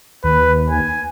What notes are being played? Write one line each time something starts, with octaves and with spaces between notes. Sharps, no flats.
D#2 B4
G#5